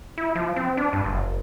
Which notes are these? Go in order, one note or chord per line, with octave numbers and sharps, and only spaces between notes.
E4
F3
C4
D4
G2
F#1